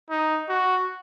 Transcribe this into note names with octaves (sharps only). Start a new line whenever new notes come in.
D#4
F#4